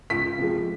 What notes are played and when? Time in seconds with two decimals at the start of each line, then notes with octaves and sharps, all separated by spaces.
0.10 C#2 B6
0.39 C3 F3 G#3